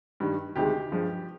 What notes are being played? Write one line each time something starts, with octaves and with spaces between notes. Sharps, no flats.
G2 D#3 G3
D2 C3 D#3 G#3 G4
G2 F3 G#3